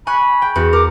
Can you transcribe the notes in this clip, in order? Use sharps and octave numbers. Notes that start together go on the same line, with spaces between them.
G#5 B5 C#6 F#6
G5
E2 F#4
A#4 D6